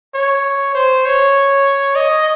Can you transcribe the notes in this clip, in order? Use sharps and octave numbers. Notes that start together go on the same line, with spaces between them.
C#5
C5
C#5
D#5